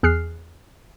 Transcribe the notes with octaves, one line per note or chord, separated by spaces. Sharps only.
E2 G#4 F6 F#6 C7